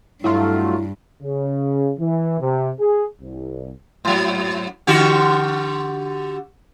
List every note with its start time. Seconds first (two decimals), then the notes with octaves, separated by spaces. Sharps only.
0.24 G2 F#3 A3 E4 F4
1.22 C#3
1.99 E3
2.40 C3
2.80 G#4
3.21 C2
4.05 G#2 F#3
4.87 D3 F#4 G4